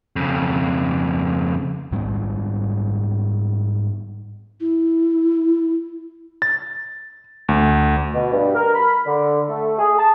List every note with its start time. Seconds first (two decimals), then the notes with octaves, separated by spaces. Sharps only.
0.16 F2 C#3
1.92 G#2 G3 G#3 B3
4.61 E4
6.42 A6
7.49 D2
8.14 B2
8.32 G2
8.55 A#4
8.73 B5
9.05 D3
9.48 A3
9.78 G#4
9.98 A5